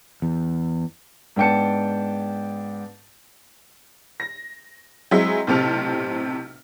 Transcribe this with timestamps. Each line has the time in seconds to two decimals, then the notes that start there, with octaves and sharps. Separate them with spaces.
0.22 E2
1.36 G#2 B3 D4 G5 A5 C#7
4.20 A#6
5.11 F#3 G#3 C4 E4 G#4 E5
5.47 B1 A2 C3 C4 A4 F6